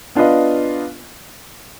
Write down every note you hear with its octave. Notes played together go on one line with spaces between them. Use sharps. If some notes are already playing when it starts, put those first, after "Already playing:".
B3 D4 F4 B4 D#5